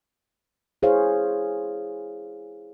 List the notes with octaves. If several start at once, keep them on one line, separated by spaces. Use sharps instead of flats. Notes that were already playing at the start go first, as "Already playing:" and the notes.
E4 G#4 C5 C#5 F5